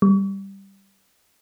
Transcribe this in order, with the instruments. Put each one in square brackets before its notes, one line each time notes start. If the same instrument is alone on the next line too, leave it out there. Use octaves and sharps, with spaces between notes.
[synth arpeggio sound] G3